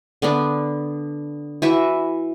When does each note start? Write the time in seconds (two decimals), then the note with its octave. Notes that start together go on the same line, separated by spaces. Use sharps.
0.22 D3 B3 D4
1.62 E3 F#4 E5